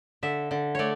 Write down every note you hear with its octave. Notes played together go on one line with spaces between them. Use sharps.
D3 E5
D3
A3 C#5 D5